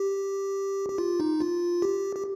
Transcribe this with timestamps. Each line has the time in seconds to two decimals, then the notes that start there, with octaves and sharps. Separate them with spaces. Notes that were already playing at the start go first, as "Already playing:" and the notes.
Already playing: G4
0.89 G4
0.98 F4
1.20 D#4
1.40 F4
1.82 G4
2.16 G4